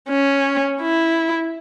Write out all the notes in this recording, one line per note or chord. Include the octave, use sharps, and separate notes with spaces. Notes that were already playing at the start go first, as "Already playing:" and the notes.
C#4
E4